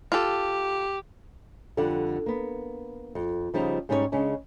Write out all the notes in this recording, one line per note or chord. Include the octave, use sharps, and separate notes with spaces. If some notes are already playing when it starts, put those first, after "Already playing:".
F4 G4 A4
F2 D3 G3 D5 F#5
A#3 B3
F2
C#3 F3 G3 D#4
G#2 G3 C#4 D#4 G#4 C#5
C#3 G#3 C#4 D4